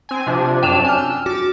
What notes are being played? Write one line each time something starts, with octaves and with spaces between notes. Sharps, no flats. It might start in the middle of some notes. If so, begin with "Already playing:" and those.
C4 G#5
C3 F3 D4
F#2 F#3 D4 G5 E7 F7
G#5 F6 G6
E6
F#4 D6 A6